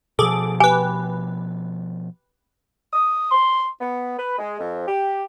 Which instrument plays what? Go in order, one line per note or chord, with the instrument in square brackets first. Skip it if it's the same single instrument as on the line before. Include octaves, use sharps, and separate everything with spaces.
[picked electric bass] B2 F3 [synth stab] G#4 A4 D6
[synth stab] G4 B4 [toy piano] G#5
[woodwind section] D#6
C6
B3
B4
G#3
F2
G4